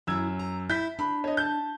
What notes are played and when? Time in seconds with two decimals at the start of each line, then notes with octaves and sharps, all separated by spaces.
0.07 F#2 C#3 E4 E6 G#6
0.39 A#5
0.70 E4 G6 B6
0.99 D4 B5
1.24 C#5 D#5
1.37 A5 G6